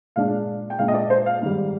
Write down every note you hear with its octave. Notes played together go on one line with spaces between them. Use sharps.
A#2 G#3 D4 F5
G5
A#2 G#3 D4 F5
D#5
D5
C5
F5
G#2 D#3 G3